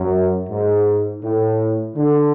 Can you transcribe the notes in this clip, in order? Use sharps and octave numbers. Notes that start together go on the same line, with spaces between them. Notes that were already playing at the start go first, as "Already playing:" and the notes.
Already playing: F#2
G#2
A2
D3